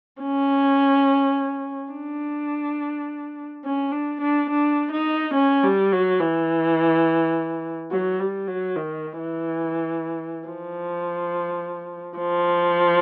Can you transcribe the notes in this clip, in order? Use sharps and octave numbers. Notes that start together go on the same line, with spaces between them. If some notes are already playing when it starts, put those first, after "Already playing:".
C#4
D4
C#4
D4
D4
D4
D#4
C#4
G3
F#3
E3
F#3
G3
F#3
D#3
E3
F3
F3